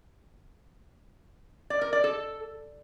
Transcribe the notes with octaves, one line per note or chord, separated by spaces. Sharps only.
D5
A#4
D5
A4